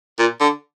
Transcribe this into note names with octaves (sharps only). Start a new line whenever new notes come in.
A#2
D3